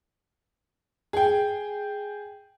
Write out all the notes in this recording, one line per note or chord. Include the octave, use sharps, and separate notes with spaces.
G#4 G5